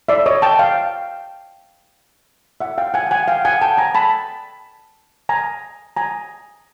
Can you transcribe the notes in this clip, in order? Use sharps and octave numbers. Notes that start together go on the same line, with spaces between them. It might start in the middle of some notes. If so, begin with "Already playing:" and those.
D5 E5
C#5 D#5
G5 A5
F5 G5
E5 F#5
F5 G5
F#5 G#5
G5
F#5 G#5
F5 G5
F#5 G#5
G5 A5
G#5 A#5
A5 B5
G#5 A#5
G#5 A#5